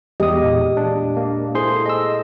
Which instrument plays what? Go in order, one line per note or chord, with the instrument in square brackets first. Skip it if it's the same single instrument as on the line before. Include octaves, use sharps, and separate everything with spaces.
[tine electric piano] E2 D#6 [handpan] G#3 G4 D#5
[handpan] A#2 F5
[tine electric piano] D4
A#3
[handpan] E4 A4 [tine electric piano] G#4 C5 C6
[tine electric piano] D#5 E6